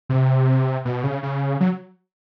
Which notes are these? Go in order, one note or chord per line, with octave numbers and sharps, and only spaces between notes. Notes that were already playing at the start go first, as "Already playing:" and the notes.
C3
B2
C#3
C#3
F#3